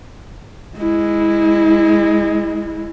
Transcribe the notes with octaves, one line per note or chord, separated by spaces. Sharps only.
G#3 E4